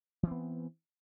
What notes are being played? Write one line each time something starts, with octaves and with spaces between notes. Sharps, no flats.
E3 B3 C4